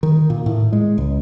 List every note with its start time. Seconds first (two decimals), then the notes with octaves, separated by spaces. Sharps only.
0.03 D#3
0.30 A#2
0.46 A2
0.73 G#3
0.98 C#2